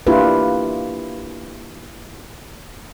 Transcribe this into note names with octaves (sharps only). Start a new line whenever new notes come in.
A#3 D4 E4 F4 G4 B4